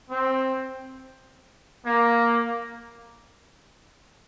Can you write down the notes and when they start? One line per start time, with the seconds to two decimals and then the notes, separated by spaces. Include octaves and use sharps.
0.11 C4
1.86 A#3